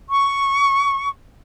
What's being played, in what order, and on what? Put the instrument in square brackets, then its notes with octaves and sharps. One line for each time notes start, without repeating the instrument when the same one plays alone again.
[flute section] C#6